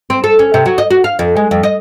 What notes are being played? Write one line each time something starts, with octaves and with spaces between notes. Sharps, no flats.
C4
A4
C#4
C3
F#3
D#5
F#4
F5
F2
G#3
F2
D#5